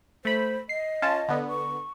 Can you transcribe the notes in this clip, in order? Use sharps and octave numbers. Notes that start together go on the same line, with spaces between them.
A3 C5 B5
D#5 C7
C#4 F4 A5
D3 B3
C#6